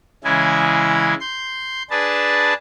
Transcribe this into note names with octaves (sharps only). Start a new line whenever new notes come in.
C#3 E3 G#3 E4 G#5
C6 G6
D4 G#4 B4 A5